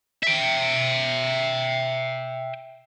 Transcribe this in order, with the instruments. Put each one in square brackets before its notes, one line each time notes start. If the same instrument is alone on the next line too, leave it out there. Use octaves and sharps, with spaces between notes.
[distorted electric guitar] E5 G5